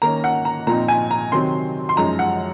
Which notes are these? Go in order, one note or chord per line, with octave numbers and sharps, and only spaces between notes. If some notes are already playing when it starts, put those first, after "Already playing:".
D#3 A#3 C#4 A#5
F#5
A#5
A#2 F3 C4 D#4 A#5
G#5
A#5
C3 D#3 F#3 C4 C6
C6
F#2 F3 G#3 D#4 A#5
F#5